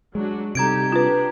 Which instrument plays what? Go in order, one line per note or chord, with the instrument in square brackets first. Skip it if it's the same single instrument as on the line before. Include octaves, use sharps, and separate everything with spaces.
[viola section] F#3 D4 F#4 [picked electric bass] G#3
[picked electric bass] C3 G3 [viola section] D#4 G4 A4 [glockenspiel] A#5 G#6 D7
[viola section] D4 G4 [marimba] F4 B4